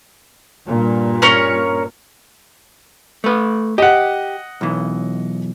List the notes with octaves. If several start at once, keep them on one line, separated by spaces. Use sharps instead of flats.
G2 A#2
C#4 A#4 C#5
A3 B4
G4 D#5 F#5
B1 E3